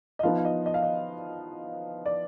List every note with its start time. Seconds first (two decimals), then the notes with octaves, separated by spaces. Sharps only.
0.19 D#5
0.23 F3 B3 D#4 F5
0.38 F5
0.45 D#5
0.66 D#5
0.74 F5
0.83 D#5
2.06 D5